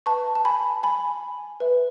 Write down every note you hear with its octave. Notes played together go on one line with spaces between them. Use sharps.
B4 E5 A5 C#6
A5
G#5 B5
G#5 B5
B4 E5